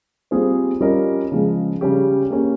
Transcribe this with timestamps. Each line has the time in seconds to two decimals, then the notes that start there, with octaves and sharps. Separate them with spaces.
0.31 G3 C4 F4 G#4 C5
0.81 G3 C#4 F4 A#4 D#5
1.32 C#3 F3 G#3
1.81 C#3 G3 C#4 G4
2.30 A#3 C#4 G4